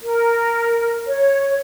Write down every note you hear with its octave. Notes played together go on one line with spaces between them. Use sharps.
A#4
C#5